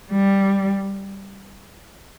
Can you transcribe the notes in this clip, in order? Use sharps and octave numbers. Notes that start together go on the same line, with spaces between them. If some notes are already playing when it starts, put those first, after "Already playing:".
G3